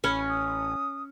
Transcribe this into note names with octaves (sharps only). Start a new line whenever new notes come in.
A1 C#4 C#5 B5
D#6